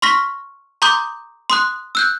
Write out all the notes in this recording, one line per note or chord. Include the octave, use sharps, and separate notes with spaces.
C6 C#6 F6 A#6 B6
A#5 C6 D6 D#6 G6
C6 D#6 F#6
E6 F#6 G6